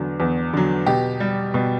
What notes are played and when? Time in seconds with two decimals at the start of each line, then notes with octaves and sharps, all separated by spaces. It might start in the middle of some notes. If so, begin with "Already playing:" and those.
Already playing: E2 D3 F#3
0.20 E2
0.53 D3 F#3
0.87 B2 G4
1.20 G3
1.54 B2